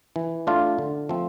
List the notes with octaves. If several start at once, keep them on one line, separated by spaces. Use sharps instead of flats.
E3
A3 D4 F4
D3
F3 A3 C4